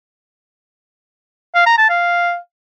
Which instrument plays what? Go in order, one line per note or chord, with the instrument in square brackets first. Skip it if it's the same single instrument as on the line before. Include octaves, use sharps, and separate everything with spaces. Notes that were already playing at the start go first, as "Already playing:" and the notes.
[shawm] F5
A#5
A5
F5